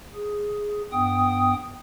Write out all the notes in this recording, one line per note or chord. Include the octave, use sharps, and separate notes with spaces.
G#4
G2 B3 G5 D#6